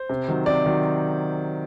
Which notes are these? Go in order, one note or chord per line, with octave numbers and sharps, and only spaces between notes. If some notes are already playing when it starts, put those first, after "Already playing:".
Already playing: C5
C3
D#3 F#3
C3 D5
D#3 F#3